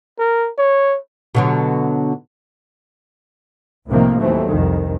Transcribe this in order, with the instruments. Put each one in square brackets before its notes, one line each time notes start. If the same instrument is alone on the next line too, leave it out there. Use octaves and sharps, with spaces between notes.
[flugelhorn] A#4
C#5
[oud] B2 D3 F#3
[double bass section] C2 A2 C3 D#3 F3 A#3
D#2 E3 F#3 A3 C4
C2 F2 D#3